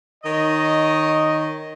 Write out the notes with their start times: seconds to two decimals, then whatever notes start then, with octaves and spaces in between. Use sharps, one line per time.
0.24 D#3 C#5 D#5